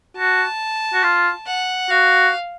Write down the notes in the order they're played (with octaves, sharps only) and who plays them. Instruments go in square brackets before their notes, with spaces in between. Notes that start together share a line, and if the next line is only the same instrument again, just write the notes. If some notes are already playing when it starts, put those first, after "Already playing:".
[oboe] F#4 [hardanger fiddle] A5
[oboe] F#4
F4
[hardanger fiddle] F#5
[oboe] F#4 [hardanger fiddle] F5